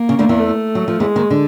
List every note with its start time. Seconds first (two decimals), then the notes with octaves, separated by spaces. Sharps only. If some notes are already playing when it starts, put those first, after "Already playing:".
Already playing: A#3
0.09 C#3
0.19 D2 D3
0.29 E2 E3
0.39 A3
0.75 F#3
0.88 F3
1.00 E2 E3 G#3
1.16 D#2 D#3
1.31 D3